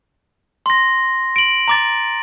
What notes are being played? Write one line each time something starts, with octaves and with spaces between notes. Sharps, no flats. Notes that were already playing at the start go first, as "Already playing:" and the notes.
C6 A#6
D7 F#7
A#5 D6 A6